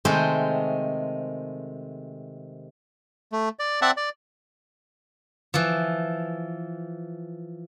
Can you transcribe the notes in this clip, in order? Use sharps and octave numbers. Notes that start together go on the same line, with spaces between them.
C3 D#3 G#3 A3 G#4 C5
A3
D5
C4 D5 E5 F#5 A5
D5
E3 F3